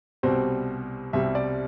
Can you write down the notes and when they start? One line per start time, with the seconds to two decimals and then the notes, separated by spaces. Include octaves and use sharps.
0.23 C2 B2 G3 C4 C5
1.13 C2 B2 G3 C4 E5
1.35 D5